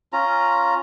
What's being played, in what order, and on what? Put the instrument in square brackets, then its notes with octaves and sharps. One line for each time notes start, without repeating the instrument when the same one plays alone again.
[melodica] C#4 F4 A#5